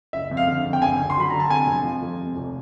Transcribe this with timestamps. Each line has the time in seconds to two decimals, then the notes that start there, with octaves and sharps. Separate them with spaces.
0.13 F#1 E5
0.31 F2
0.37 F5
0.48 D3
0.65 F2
0.73 G5
0.81 F#1 G#5
0.99 D3
1.10 C6
1.17 F#3 B5
1.30 D3 A#5
1.40 A5
1.50 C3 G#5
1.67 F2
1.84 F3
2.02 F2
2.18 C3
2.36 F1